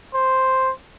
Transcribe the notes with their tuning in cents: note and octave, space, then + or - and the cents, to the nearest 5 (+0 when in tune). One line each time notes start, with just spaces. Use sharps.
C5 +0